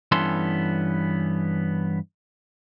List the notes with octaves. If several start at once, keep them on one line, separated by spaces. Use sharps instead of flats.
G2 E3 B3 C#4 A4 C6